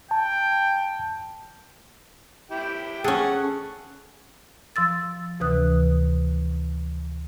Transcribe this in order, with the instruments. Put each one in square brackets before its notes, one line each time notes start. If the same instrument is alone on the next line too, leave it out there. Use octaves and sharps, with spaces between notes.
[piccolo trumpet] G5 [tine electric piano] A5
[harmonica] E4 G4 G5
[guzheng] C#4 A4 [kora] G#4 [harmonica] F#5
[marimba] F3 C6 E6 A6
D2 C3 E3 B4 D#6 F#6